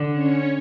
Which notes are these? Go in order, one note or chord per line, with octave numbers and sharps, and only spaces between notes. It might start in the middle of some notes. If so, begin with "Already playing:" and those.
Already playing: D3
C#4 C#5